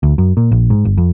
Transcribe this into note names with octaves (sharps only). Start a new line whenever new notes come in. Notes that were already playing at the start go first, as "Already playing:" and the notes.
D2
F#2
A#2
A#1
G#2
G1
F2